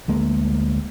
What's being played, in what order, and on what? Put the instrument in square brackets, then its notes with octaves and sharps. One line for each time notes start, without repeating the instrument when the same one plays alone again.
[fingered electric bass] D2 G#3 A#3